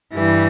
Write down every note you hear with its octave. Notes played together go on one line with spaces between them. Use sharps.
G2 E3 G3